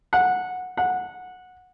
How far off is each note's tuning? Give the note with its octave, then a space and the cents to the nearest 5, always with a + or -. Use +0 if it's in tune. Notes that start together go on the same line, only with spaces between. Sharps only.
F#5 -15
F#5 -15